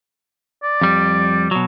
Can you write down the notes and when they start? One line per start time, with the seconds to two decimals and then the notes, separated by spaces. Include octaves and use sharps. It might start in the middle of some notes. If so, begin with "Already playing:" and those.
0.63 D5
0.81 F2 G3
1.51 B2 F#3